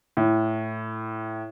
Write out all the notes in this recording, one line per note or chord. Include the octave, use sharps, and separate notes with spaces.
A2